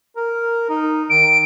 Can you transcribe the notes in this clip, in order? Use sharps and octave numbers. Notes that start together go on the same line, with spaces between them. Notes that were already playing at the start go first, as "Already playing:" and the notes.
A#4
D#4
D#3 D7